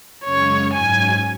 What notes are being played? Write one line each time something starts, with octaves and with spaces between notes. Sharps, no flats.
F#2 C#3 G#3 C#4 C#5
G#2 F#3 C#4 G#5